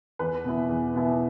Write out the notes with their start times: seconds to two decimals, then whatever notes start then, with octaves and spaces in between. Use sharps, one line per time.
0.19 E2 B4
0.44 B2 B3 E4
0.69 E2
0.94 B2 B3 E4